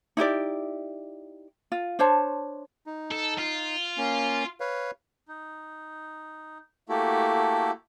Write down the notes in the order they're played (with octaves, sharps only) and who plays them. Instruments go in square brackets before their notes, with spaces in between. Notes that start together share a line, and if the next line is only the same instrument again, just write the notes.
[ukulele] D#4 E4 G4 D5
F4
D4 C5 C#5 A5
[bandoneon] D#4
[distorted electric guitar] A4
F4
[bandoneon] A#3 C#4
B4 C#5 F5
[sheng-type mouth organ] D#4
A3 A#3 E4 F#4 G4 A4